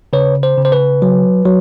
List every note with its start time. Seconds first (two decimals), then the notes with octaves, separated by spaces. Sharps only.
0.13 C#3 B4 C#5
0.43 C5
0.58 C#3
0.65 C5
0.72 B4
1.02 F#3
1.45 F#3